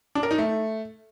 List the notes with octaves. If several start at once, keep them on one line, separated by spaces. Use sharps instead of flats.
D4
A#4
D#4
A3